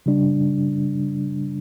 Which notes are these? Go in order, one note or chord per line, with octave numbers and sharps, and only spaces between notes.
C#3 G3 D4